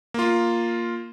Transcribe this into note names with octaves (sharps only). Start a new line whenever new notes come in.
A#3 F4